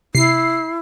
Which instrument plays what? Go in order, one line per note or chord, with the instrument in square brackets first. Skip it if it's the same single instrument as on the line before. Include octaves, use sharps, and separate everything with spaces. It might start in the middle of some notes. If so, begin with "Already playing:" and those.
[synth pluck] C3 [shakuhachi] E4 [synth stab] C7